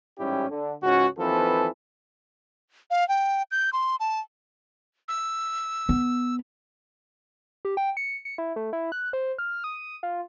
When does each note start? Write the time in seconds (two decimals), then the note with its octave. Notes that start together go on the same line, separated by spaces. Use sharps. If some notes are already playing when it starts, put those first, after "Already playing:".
0.18 A1 G#2 G3 C#4 E4 G4
0.49 D3
0.82 C#2 G#2 C#3 C#4 F#4
1.18 D#2 E3 F3 C4 A4 B4
2.91 F5
3.08 G5
3.51 G6
3.73 C6
4.00 A5
5.08 E6
5.89 B3
7.65 G4
7.77 G5
7.97 C#7
8.25 C#7
8.38 E4
8.56 A3
8.73 E4
8.92 F#6
9.13 C5
9.39 F6
9.64 D#6
10.03 F4